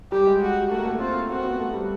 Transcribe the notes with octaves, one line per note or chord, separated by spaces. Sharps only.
G3 G4
G#3
F#4
A3 F#4
A#3
A3
C4 F4
C4 F#4
B3
A3
G3